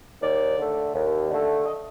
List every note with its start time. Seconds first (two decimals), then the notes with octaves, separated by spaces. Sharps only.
0.21 D#2 D5
0.57 D3 A3
0.93 D#2
1.29 D3 A3
1.65 D#5